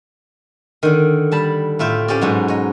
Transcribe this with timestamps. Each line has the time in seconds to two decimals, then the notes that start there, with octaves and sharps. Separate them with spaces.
0.83 D3 D#3
1.32 G3 A5 B5
1.79 A2 F4 E5 G5
2.08 C4 C#4 G4 D5
2.21 G#2 B2 F#3 D#4
2.48 C#5 D#5